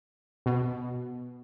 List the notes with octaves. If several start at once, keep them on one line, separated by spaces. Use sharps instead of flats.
B2